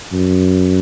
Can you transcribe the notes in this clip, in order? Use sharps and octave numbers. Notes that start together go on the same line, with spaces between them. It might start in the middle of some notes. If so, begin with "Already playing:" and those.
F#2